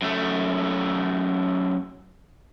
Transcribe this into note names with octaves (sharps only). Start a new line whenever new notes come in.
F#2 A3